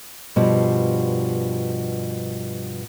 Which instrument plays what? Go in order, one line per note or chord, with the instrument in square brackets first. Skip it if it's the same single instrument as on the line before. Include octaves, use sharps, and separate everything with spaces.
[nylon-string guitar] G2 B2 F3 G3